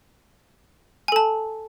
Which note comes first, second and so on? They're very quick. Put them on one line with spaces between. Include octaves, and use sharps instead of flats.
G#5 A4 A5